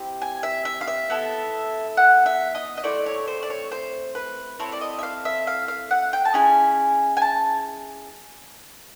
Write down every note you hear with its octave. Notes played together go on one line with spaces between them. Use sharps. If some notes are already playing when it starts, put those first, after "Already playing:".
Already playing: C4 E4 G4
G#5
E5
E5
F5
E5
B3 E4 A4
F#5
E5
D#5
D#5
A3 C4 E4 D5
C#5
C5
D5
C#5
C5
B4
C4 E4 A4 C#5
D5
D#5
E5
F5
E5
F5
F5
F#5
G5
A5
C#4 E4 G#4 G#5
G#5
A5